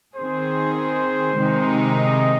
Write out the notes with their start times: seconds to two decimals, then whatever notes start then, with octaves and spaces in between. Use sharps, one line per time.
0.16 D#3 C4 G#4 C5
0.77 C5
1.38 C3 D#3 G#3 C4 D#4
1.98 D#5